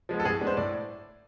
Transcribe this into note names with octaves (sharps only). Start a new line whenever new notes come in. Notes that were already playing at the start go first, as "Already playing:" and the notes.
F3 G#3 B3
A4
A2 G#4
G#3 B3 D4
C5
A2 D5